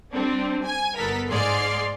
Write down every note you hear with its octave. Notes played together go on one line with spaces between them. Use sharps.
G3 C4 D4
G#5
G1 B3 A4 A#4 B6
G#2 G#4 D5 C6 F6